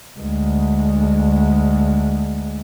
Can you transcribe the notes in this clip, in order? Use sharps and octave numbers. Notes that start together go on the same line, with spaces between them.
D2 G#3